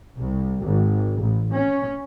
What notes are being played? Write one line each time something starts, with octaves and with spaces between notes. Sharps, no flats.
C2
G#1
A1
C#4